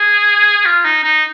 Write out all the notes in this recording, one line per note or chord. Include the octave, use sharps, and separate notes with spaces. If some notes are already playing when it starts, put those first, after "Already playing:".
Already playing: G#4
F4
D#4
D#4